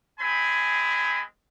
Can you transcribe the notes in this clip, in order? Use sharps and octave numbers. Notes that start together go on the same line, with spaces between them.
G#3 C4 G#5 B5